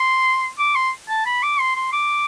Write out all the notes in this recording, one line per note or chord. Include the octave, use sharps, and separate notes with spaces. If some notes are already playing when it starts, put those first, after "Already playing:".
Already playing: C6
D6
C6
A5
B5
D6
C6
C6
D6